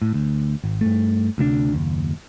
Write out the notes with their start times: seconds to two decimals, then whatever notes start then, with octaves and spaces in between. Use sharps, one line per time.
0.02 A2
0.14 D2
0.64 G#1
0.81 G2 A3
1.38 D2 C3 F#3 D4
1.72 F#1 D#2